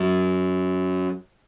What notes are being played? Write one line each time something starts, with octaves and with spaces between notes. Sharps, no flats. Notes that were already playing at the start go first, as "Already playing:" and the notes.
Already playing: F#2